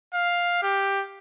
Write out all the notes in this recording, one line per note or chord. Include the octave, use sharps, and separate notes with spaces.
F5
G4